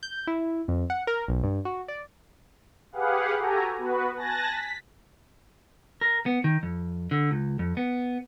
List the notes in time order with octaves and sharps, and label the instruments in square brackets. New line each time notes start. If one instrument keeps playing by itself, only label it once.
[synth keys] G6
E4
F2
F#5
A#4
B1
G2
F#4
D5
[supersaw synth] G4 G#4 B4 F5 F#5
F#4 G4 A4 G#5 A#5
B3 F#4 B4
G#5 A5 F#6 A6 A#6
B6
[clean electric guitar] A#4
B3
D#3
F2
D3
C#2
F2
B3